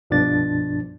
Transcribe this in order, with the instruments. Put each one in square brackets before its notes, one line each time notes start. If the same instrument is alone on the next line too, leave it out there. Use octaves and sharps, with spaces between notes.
[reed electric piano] C2 G2 B2 F3 D4 A6